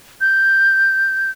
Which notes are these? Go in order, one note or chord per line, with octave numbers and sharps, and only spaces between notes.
G6